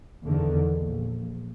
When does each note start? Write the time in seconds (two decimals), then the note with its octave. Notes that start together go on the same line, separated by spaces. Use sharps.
0.24 E2 D3 D#3
0.74 A#1